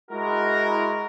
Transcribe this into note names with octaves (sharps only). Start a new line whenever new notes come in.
G#3 E4 F#4 A#4